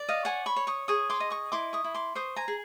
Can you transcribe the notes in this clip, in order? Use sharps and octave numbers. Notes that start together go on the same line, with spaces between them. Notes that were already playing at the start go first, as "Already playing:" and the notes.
Already playing: D5
D#5 F5
C#5 F#5 G#5
B5 C#6
C#5
C#6 D#6
G#4 C#6 D#6
C6 D6
D#5
C#6 D#6
E4 C6 D6
C#6 D#6
E4
C6 D6
C5 C#6 D#6
G#5 A#5
G#4